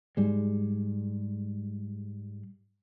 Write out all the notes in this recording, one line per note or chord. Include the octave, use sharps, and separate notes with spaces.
G#2 G3 G#3